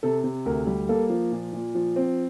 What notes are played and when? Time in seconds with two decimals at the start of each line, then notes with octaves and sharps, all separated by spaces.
0.03 C3 A4
0.24 C3
0.45 D2 A#4
0.67 G3
0.89 A#3 A4
1.10 F3
1.32 A#2
1.53 A#2
1.75 F3
1.96 C4